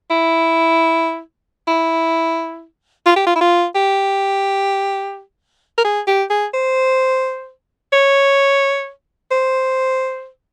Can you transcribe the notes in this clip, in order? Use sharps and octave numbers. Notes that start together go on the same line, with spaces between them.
E4
E4
F4
G4
F4
E4
F4
G4
A#4
G#4
G4
G#4
C5
C#5
C5